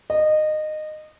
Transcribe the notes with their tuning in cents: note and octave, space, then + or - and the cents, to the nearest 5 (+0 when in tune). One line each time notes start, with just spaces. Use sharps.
D#5 -20